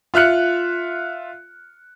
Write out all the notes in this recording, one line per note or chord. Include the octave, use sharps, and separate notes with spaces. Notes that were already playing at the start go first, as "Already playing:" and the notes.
F4 E5 F6 F#6 C#7